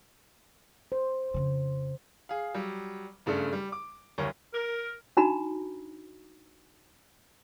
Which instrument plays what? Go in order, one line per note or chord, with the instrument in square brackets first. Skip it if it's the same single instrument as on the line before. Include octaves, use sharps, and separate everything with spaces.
[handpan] C5
[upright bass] F2 C#3
[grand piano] G#4 F5
F#3 G3
F#1 G2 C#3 A3 D4 A4
G3
D6
F#1 D2 G3 A#4 C#5
[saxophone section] A#4
[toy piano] D4 D#4 F#4 A#5 B5